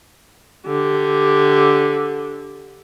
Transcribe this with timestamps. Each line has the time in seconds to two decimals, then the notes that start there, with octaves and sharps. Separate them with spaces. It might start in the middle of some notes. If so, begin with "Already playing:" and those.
0.67 D3 G4